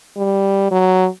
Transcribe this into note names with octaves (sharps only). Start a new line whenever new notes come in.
G3
F#3